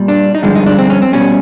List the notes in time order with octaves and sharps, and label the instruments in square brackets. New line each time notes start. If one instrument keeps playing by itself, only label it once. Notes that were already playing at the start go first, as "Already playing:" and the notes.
Already playing: [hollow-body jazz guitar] A#2 G3
D4
D#4
G2 D3 F3 G#3 D4
D#4
D4
C4
C#4
C4
B2 G3 C#4